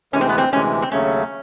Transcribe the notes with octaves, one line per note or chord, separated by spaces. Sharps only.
D2 C3 E3 G#3 C#4
C4
B3
C4
D2 C3 E3 G#3 C#4
C4
D#2 C#3 F#3 A3 C#4